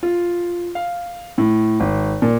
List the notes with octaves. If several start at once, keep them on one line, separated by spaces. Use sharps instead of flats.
F4
F5
A2
G#1
A#2